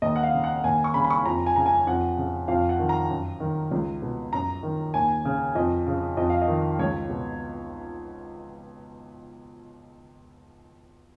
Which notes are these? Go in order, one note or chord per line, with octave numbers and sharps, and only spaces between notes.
D#2 D#5
F#5
F5
C#3
F#5
D#2 G#5
C#6
C#3 B5
B5
C#6
F2 A#5
G#5
C#3 A#5
G#5
F2 F#5
C#3
F2 F5
F#5
D#3
A#5
F#2
D#3
C#2
B2
F#2 A#5
D#3
D#2 G#5
C#3
F2 D#5
C#3
F2 D#5
F5
D#5
D#3
C#2 C#5
B2